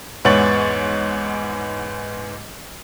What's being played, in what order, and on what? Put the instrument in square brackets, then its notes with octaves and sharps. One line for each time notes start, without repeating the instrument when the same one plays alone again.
[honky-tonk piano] E2 G#2 B3 C#5 A6 F#7